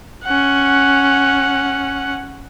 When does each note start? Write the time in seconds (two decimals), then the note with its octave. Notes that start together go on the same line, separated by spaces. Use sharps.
0.25 C#4 F#5